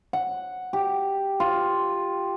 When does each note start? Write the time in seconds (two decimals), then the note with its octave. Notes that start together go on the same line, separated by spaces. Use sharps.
0.13 F#5
0.73 G4
1.40 F4